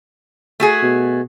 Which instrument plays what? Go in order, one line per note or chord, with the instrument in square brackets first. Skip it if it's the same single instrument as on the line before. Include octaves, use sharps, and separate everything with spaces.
[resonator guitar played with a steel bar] A3 F#4 G#4
[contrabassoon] B2